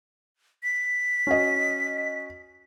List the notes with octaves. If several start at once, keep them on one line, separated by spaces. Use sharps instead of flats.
B6
C#4 F#4 D#5